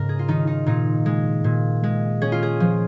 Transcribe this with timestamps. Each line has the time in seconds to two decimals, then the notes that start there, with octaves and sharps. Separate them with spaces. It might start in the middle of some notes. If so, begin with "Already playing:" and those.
Already playing: G#2 C#3 C#4 A#4
0.09 G#4
0.19 F4
0.28 D#3 D#4
0.47 D#4
0.66 A#2 D#4
1.06 G#3
1.44 A#2
1.83 G#3
2.22 C#4 G#4
2.32 F4
2.42 G#4
2.60 F3